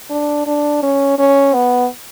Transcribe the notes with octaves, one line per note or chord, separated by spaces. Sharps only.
D4
D4
C#4
C#4
B3